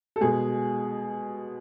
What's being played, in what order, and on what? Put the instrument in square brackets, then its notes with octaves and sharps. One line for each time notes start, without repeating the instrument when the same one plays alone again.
[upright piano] A4
B2 G#3 G#4